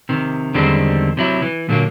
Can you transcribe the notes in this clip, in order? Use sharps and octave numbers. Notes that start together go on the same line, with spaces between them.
C3 D#3
E2 D3 D#3 G3 G#3 C4
C3 F#3 E4
E3
A#2 D3 F#3 A3 A#3